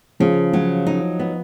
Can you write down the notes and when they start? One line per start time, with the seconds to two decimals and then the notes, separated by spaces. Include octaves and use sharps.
0.20 C#3 F3
0.53 F3 F#3
0.86 D#4
1.19 B3